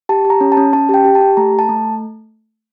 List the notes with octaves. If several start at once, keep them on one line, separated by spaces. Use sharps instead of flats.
G4 A5
G4
A#5
C#4
A5
C#4
C#4 A5
G4 G5
G4
A5
G4
A3 A#5
A3
A5
A3